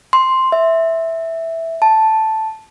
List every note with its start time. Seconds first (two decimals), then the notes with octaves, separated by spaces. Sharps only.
0.13 C6
0.52 E5
1.82 A5